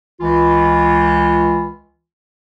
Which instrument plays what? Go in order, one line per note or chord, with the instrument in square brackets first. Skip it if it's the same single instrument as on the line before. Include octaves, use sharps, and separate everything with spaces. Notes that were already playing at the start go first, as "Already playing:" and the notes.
[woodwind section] C#2 E3 F4